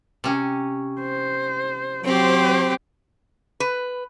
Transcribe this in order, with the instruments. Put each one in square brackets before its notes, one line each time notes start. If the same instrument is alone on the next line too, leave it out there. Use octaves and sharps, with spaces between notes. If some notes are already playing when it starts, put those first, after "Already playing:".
[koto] C3 C#4
[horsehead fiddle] C5
[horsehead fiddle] F#3 C5 [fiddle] C4 G4
[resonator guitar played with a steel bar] B4